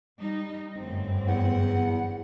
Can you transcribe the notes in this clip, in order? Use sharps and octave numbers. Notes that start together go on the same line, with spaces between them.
G3 D#4
G1 F#2 A2 C4
E2 F#5